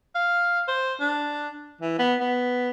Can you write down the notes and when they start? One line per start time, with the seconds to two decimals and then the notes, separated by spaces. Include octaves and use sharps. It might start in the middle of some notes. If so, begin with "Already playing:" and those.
0.15 F5
0.68 C5
1.00 D4
1.81 E3
1.99 B3
2.20 B3